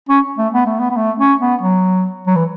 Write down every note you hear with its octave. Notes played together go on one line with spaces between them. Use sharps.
C#4
A3
B3
A3
B3
B3
A3
C#4
B3
F#3
F#3
E3